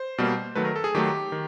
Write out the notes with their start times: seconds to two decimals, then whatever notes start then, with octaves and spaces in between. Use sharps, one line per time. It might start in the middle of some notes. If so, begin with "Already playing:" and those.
Already playing: C5
0.18 B2 G3 A#3
0.55 D#3 F#3 A3 B4
0.65 A#4
0.76 A4
0.84 G#4
0.95 D#3 F#3 A3 G4
1.32 D#3